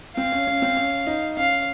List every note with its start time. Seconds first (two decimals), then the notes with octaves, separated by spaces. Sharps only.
0.17 C4 F5
0.32 C#4
0.47 C#4
0.62 C4
0.77 C#4
1.07 D#4
1.37 C#4 F5